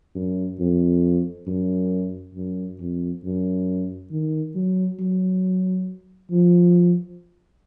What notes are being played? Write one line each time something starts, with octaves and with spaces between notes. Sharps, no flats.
F#2
F2
F#2
F#2
F2
F#2
D#3
F#3
F#3
F3